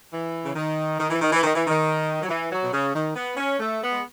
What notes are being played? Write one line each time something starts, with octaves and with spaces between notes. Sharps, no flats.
E3
C#3
D#3
D#3
E3
D#3
E3
D#3
E3
D#3
F#3
E3
F#3
B2
C#3
D#3
B3
C#4
A3
B3
G#3